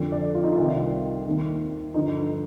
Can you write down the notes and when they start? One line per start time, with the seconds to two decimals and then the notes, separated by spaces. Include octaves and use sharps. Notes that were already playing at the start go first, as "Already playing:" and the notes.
Already playing: F2 D3 F3
0.12 D5
0.35 F4
0.44 D#4
0.52 F4
0.58 C2 C3 D#3
1.26 D#2 D#3
1.94 G2 D3 F3 D#4